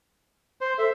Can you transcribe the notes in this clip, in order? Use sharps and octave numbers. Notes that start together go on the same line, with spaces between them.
C5
A4 E5